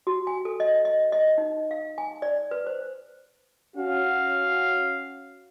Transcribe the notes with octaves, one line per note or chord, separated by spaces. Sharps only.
F#4
G#5
A4
D#5
D#5
D#5
D#4
F5
G#5
D5
B4
C5
C#4 F#4 F5